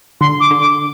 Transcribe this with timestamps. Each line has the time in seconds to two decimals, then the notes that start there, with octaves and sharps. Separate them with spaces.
0.20 D3 C6
0.40 D6
0.51 D3
0.60 D6